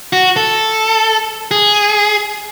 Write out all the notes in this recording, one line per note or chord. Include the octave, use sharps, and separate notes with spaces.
F#4
A4
G#4